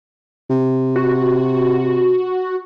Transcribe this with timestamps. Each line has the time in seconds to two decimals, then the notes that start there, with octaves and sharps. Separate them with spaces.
0.50 C3
0.96 F#4